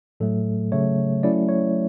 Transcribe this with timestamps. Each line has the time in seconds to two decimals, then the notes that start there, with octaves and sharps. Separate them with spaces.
0.20 A2 F#3 A3 A4
0.72 C#3 F#3 A3 C#5
1.23 F#3 A3 C#4 E4 D5
1.49 C#5